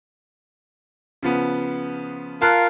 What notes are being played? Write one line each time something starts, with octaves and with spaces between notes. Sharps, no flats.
C#3 F3 B3
F4 A#4 F5 A5 F#6